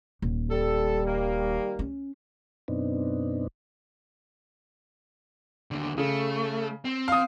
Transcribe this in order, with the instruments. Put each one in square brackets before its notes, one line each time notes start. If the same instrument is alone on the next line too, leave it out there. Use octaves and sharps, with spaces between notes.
[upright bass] D#1
[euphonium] G3 [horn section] A4
[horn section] D#3 A#3
[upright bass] C#4
[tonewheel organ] F#2 B2 B3 C4 D4 D#4
[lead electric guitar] D#2 D3
[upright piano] C#3 [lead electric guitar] A3
[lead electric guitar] C4
[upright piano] F5 D#6